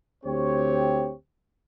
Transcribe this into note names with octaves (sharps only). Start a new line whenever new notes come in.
D2 C4 G4 C#5